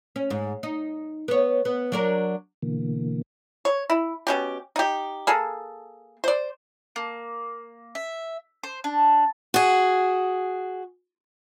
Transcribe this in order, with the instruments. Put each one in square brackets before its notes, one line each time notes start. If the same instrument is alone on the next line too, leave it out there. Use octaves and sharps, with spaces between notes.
[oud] C#4
G#2
D#4
B3 C#5
B3
F#3 D4 A#4
[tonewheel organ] B2 D3 E3 A#3
[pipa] C#5
E4
B2 C#4 G4
D#4 G4
A#3 G#4 A4
C5 D5
[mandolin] A#3
E5
C5
D4
[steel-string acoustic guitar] F#4 G#4